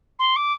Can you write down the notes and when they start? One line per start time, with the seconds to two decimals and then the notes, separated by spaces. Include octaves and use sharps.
0.19 C6
0.36 D6